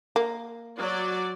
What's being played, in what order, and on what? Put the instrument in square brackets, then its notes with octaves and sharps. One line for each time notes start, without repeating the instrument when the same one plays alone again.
[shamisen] A#3
[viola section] F#3 D5